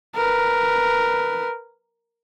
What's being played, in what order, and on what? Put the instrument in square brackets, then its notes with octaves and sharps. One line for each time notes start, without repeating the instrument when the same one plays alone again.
[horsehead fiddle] A#4 B4